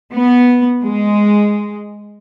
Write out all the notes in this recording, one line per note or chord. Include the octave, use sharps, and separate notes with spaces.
B3
G#3